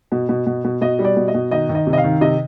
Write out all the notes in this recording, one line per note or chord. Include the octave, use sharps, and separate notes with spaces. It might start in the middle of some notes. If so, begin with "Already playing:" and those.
B2
B2
B2
B2
B2 D#5
G3
D5
B2
D#5
B2
D#3 D#5
D#3
D#5
C3
D#5
F5
D#3
C3 D#5